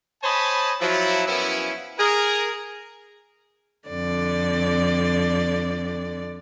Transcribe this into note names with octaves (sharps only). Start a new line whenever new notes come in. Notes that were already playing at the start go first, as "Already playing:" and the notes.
C5 C#5 D#5 G#5 A5 B5
F3 F#3 E4
F#2 F3 B3 C#4 E4
G#4 A#4
F2 D3 D5